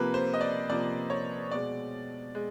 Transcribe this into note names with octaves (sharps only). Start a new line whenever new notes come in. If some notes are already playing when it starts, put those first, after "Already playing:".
Already playing: C3 F3 A#3 B4
C5
D#5
D5
C3 F3 A#3 D5
C#5
B2 G#3 D5
G#3